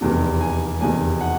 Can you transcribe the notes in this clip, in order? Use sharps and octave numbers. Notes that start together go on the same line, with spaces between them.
F1 E2 C3 D#3
G#5
F1 E2 C3 D#3 G#5
F#5